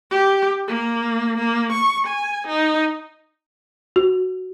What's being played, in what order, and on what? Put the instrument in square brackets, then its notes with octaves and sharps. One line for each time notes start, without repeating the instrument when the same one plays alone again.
[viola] G4
A#3
A#3
C#6
G#5
D#4
[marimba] F#4